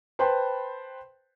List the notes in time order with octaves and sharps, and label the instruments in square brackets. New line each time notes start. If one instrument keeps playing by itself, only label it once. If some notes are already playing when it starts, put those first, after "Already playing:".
[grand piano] B4 C5 G5 A5 B5 C6